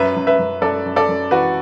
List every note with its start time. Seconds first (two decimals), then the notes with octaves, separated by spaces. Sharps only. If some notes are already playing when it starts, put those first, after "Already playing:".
Already playing: F#2 B4 E5
0.16 F#2
0.27 B4 E5
0.39 F#2
0.62 F#2 A4 D5
0.86 F#2
0.96 A4 D5
1.09 F#2
1.31 E3 F#4 B4